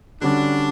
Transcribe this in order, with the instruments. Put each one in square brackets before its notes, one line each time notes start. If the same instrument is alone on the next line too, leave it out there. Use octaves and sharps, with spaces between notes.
[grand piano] D3 G3 C#4 F#4 [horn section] D4